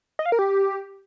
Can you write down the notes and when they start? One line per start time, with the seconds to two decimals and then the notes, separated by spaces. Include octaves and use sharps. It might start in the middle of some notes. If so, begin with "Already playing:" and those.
0.19 D#5
0.26 F5
0.32 A#4
0.39 G4